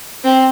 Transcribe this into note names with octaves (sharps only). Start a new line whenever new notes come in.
C4